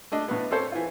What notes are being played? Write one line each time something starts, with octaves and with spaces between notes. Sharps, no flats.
A3 D4 D#5
A2 B3
C4 C#4 A4 C5 C#5
E3 F4